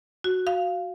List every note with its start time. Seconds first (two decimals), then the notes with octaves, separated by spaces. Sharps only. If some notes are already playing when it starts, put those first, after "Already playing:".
0.24 F#4
0.47 F5